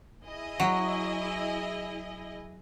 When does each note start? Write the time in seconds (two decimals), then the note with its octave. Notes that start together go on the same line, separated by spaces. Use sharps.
0.25 E4 G#4 D#5
0.60 F#3